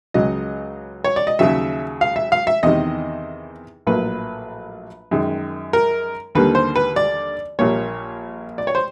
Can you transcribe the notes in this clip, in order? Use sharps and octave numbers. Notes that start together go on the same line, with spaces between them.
C#2 C#3 F#3 D#5
C#5
D5
D#5
D#2 C#3 F#3 E5
F5
E5
F5
E5
E2 C3 D#3 D#5
A#1 A2 F#3 A#3 B4
F#2 D#3 G#3
A#4
D#2 D3 G3 A#3 B4
C5
B4
D5
A#1 A#2 G3 A#3 C#5
D5
C#5
C5